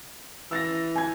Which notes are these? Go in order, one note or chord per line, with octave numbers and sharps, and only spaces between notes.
E3 E6 A6 A#6
G#5 G#6